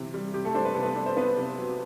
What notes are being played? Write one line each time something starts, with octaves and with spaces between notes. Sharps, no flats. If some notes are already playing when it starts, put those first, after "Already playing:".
Already playing: C3 E3
G3
C3 G4
A3 A4
C4 D4 C5
B4
C3 A4
B3 B4
D4
C5
B3 D4 B4
C3
F#3